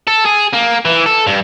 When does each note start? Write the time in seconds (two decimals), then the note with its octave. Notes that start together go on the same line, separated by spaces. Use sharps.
0.07 A4
0.25 G#4
0.53 A#3
0.85 E3
1.06 A4
1.27 G2